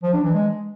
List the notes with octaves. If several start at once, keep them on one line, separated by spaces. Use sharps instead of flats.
F3
D4
E3
G#3